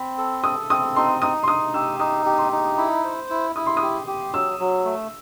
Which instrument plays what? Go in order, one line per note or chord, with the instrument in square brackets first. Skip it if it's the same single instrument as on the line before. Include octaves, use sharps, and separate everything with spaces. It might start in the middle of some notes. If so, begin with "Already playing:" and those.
Already playing: [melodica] C4 [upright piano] B5
[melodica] A4
[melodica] A4 [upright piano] D#6
[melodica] C4 [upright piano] D#6
[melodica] D#4 [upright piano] C6
[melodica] D#4 [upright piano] D#6
[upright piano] C6
[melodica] D#4 [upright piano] D#6
[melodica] G4 [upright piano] E6
[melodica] D#4 [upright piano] D#6
[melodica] G4
[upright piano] C6
[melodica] D#4
[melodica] E4 [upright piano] B5
[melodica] C5
E4
[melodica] E4 [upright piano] D#6
[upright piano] C6
D#6
[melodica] G4
G4
[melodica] F#3 [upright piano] E6
[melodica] F#3
A3